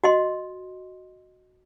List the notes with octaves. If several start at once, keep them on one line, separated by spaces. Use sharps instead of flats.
F#4 D#5 C6